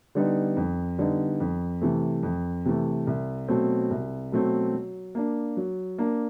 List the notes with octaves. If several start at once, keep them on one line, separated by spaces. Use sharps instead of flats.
D3 G3 B3 D#4
F2
D3 G3 B3 D#4
F2
C3 E3 A3
F2
C3 E3 A3
C2
B2 F#3 A3 C4
C2
B2 F#3 A3 C4
F#3
A#3 D4
F#3
A#3 D4